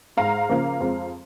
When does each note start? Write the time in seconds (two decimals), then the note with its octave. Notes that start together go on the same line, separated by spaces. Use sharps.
0.17 G#2 G#3 F5 A#5
0.49 C#3 F3 A#3
0.80 F2 F3 G#3